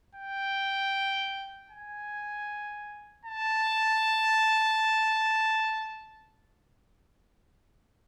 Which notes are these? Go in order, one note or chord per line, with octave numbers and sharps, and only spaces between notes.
G5
G#5
A5